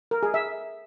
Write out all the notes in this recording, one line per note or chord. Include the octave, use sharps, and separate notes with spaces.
A#4
G#4
E5